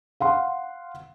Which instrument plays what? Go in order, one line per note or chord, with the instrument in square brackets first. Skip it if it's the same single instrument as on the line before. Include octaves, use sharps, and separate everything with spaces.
[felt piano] F5 F#5 C6